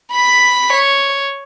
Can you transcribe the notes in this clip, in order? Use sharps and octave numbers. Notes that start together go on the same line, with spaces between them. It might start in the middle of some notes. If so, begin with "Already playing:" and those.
B5 B6
C#5